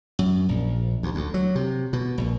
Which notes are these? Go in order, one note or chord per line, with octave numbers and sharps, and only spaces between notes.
F#2
A#1
D2
D2
F#3
C3
B2
A#1